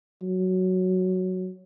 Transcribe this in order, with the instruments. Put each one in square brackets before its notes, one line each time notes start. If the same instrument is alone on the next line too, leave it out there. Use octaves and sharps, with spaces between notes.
[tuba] F#3